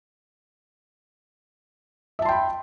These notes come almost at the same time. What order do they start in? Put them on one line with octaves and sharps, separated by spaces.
E5 A5 C6 G5 B5